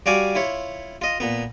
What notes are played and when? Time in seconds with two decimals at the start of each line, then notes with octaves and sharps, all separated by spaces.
0.06 G3 F#4 D5 F5 G#5 D6
0.35 E4 F4 C#5
1.02 F4 D#5
1.20 A#2 B3